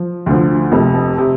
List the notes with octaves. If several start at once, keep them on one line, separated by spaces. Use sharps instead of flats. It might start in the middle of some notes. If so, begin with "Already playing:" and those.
Already playing: F3
D2 D3 F3
F1 F2 C3
C3